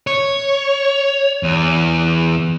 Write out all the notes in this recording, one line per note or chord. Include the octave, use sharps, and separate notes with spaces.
C#5
E2